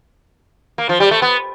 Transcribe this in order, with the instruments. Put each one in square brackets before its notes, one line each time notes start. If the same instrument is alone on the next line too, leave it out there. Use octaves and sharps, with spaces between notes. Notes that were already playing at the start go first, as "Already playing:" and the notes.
[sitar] A#3
F3
G3
A3
B3